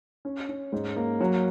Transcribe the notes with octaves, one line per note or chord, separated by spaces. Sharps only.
C#4
C#4
G#2
A#3
F#3